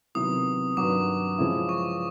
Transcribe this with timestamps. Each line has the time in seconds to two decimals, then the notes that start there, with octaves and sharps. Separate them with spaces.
0.15 C3 D#3 F#3 B3 E4 D#6
0.77 G2 D#3 F#3 D6
1.38 C#3 F3 G#3 C#4 E4
1.69 C#6